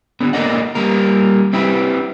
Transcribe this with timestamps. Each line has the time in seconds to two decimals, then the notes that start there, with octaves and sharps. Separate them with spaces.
0.20 D3 B3
0.33 A#3 A4 A#4 D5 D#5 F#5
0.75 G3 A#3 A#4
1.53 C4 E4 G4 B4